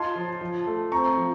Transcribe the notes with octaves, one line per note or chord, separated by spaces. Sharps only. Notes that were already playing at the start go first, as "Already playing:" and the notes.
Already playing: D#4 F4 C#5 A5 C6
F3
F3
A3
C4 A#5 C#6
F3